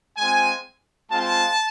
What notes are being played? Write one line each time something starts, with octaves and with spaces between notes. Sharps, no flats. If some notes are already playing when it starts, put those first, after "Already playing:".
G#3 C4 F4 G#5
G#3 C4 F4 A5